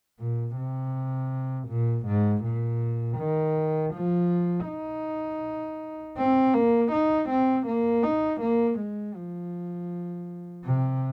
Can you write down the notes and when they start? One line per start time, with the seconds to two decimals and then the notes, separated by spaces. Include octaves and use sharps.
0.19 A#2
0.57 C3
1.68 A#2
2.06 G#2
2.43 A#2
3.18 D#3
3.93 F3
4.67 D#4
6.17 C4
6.54 A#3
6.92 D#4
7.29 C4
7.66 A#3
8.03 D#4
8.41 A#3
8.79 G#3
9.15 F3
10.65 C3